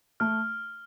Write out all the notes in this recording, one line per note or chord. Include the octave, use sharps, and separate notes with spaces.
A3 F6